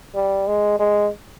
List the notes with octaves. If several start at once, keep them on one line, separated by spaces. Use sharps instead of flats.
G3
G#3
G#3